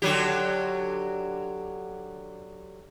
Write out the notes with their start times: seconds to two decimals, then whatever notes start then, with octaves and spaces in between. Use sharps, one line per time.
0.02 D3 F#3 G4